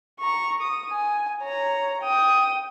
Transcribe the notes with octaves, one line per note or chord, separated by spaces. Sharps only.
A#5 C#6
D#6
G#5
C#5 A#5
G5 D#6